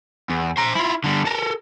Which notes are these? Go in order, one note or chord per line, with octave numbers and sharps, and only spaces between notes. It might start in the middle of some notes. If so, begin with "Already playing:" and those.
E2
C5 A#5
E4 F4
D3 G3
A4 A#4